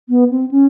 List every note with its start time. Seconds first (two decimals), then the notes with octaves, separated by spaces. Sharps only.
0.09 B3
0.30 C4
0.51 C#4